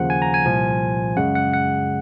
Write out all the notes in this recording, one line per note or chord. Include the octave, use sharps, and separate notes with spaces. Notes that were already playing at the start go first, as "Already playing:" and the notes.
Already playing: D#2 C#3 F3 A#3 F#5
G#5
A#5
G#5
C2 A#2 F3
F#2 C#3 G#3 F#5
F#5
F#5